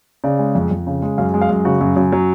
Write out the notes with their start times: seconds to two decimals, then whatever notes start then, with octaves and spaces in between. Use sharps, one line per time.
0.24 C#3 D5
0.39 G#3
0.55 F2
0.71 F2
0.87 C#3
1.02 G#3
1.18 F#2 F5
1.34 G#3
1.41 F5
1.49 F#2
1.65 C#3 F#4
1.81 F#2
1.97 F#2
2.12 F#3